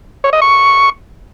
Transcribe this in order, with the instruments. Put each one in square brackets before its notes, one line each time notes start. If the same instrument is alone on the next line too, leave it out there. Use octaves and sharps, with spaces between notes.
[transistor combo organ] C#5
D#5
C#6